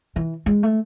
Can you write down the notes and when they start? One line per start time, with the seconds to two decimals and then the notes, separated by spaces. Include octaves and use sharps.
0.16 E3
0.46 G#3
0.63 A3